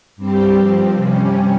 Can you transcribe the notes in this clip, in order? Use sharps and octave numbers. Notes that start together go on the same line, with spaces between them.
G2 G3 C4 G4
G2 F3 C4
C3 G3 C#4